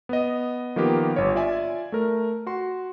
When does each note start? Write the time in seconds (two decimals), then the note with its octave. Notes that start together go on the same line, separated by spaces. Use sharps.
0.09 B3 D#5
0.76 D#3 F3 A#3 B3 G4
1.16 G1 C#5
1.35 F4 D5 E5 G#5
1.92 A3 A#4
2.47 F#4 C6